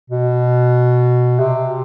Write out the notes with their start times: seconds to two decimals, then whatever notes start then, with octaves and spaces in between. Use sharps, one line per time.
0.10 B2
1.39 C3